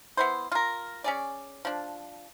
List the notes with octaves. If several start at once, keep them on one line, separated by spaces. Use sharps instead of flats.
B3 E4 C5
F4 A#4
C#4 G#4 D5
F3 D4